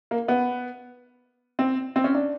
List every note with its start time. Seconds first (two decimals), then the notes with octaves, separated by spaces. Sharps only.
0.11 A#3
0.28 B3
1.59 C4
1.96 C4
2.04 C#4
2.15 D4